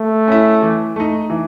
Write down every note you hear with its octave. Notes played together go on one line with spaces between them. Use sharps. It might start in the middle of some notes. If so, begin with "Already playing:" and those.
Already playing: A3
C#4 E4
E3
A3 D#4
E3